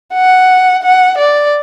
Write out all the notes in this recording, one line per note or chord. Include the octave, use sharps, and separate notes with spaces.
F#5
F#5
D5